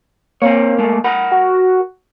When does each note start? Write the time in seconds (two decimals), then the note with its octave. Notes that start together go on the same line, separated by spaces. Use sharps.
0.42 A#3 C4 C#5
0.78 G#3 A3
1.04 A#4 F#5 B5
1.32 F#4